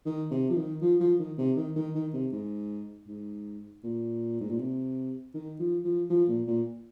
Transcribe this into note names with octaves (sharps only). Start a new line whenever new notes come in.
D#3
C3
F3
D#3
F3
F3
D#3
C3
D#3
D#3
D#3
C3
G#2
G#2
A#2
G#2
A#2
C3
D#3
F3
F3
F3
A#2
A#2